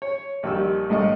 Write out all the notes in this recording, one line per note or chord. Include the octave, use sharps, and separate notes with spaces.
C#5
A#1 D#3 G3 E6
A#1 A2 D#5